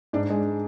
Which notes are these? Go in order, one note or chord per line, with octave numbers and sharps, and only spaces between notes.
G#2 D4 D5
G#3